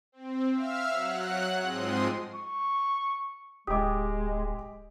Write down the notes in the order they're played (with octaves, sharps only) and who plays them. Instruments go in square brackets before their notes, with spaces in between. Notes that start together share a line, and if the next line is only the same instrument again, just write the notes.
[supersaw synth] C4
E5 F5 E6 F6
F#3 F#5 F#6
G#2 F3 G#3 C4 C6 D#6
[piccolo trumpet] C#6
[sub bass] D1 [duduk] G#3 [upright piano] G4 D6 [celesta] D#5 D#6